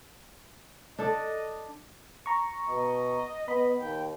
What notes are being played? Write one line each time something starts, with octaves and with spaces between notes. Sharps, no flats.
D4 A4 D#5
A#5 C#6
B2 D#5
B3 B5
D#2 G5